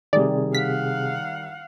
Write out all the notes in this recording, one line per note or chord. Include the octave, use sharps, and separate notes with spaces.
C3 D#3 G3 G#4 D5
F5 F#5 B6